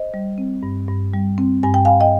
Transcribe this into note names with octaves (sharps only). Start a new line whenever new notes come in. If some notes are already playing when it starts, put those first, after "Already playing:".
Already playing: C5 D#5
G3
C4
G2
G2
G3
C4
G2 G#5
G5
F5 G#5
G2
D#5 G5